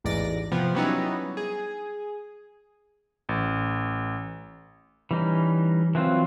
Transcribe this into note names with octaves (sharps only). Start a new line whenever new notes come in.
A1 E2 G#2 D5 A#6
C3 F3 B3
F#3 G3 B3 C#4 D#4 E4
G#4
A1
E3 G3 C#4 D#4
E3 F#3 C4 F4